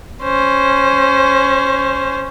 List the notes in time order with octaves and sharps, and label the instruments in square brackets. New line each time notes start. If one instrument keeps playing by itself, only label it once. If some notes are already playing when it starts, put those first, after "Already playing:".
[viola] C#4 C5